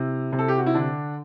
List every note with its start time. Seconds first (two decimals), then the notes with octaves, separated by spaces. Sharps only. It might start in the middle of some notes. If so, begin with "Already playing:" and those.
Already playing: C3 E4
0.32 C3
0.39 A4
0.48 G4
0.58 F#4
0.66 E4
0.75 D3 D4